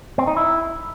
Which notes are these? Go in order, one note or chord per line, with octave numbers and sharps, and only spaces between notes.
C4
D#4
E4